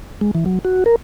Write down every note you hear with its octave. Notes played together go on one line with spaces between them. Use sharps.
G#3
E3
F#3
F#4
A#4